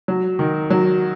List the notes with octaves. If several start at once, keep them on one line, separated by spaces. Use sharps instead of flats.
F#3
D#3
F#3